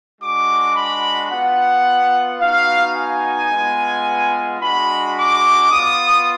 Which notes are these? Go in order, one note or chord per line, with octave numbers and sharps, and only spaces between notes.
G#3 D4 F#4 D6
B5
B3 F4 F#5
B3 D#4 F#4 F5
G#5
G#3 B3 F4
G#3 D4 F#4 B5
D6
B3 F4 D#6